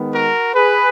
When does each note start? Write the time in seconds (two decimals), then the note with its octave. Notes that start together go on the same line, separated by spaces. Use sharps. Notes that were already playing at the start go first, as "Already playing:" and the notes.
Already playing: D#3 G#3 B3
0.14 F#4 A#4
0.54 G#4 B4